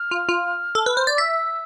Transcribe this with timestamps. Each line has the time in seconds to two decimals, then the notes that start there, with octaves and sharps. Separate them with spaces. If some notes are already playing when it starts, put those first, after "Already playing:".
Already playing: F6
0.11 F4
0.29 F4
0.75 A4
0.86 B4
0.97 C5
1.07 D5
1.18 E5 E6